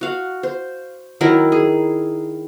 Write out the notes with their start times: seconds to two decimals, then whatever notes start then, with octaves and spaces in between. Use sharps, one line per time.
0.01 F#4 F5 F#5
0.43 C5
1.21 D#3 F#3 E4 A#4
1.52 G#4